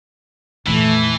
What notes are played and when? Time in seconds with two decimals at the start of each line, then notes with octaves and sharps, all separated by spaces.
0.67 F2 A#2 E3 A3